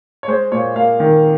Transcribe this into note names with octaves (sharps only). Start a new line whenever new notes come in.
C#5
G#3 C5
A#2 C#5
A#3 F5
D#3